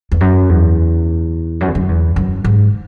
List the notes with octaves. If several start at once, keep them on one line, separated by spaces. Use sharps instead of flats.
E2
F#2
E2
F#2
E2
F#2
E2
F#2
G#2